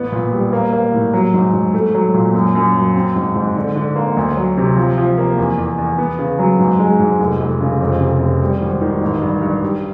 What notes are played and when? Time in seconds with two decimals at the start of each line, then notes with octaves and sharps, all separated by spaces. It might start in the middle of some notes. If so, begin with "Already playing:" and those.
Already playing: A1 B3
0.12 A#2
0.32 G3
0.53 A#3
0.73 A#3
0.94 A2
1.13 F#3
1.34 G#2
1.53 G#2
1.74 A3
1.94 F#3
2.14 A#2
2.34 F#2
2.55 F#2
2.75 F#3
2.95 C4
3.16 G#2
3.36 G#2
3.56 D3
3.76 D3
3.96 A#3
4.17 D2
4.37 F#3
4.57 C3
4.77 F3
4.98 F3
5.18 A#3
5.38 E2
5.58 E2
5.78 E2
5.98 B3
6.19 C#3
6.39 F#3
6.59 G#2
6.79 G#3
7.00 G#2
7.20 F1
7.40 F1
7.60 C#3
7.81 F2
8.01 C3
8.21 F1
8.42 G3
8.62 G#1
8.81 D#3
9.02 A1
9.22 G2
9.42 G2
9.62 G3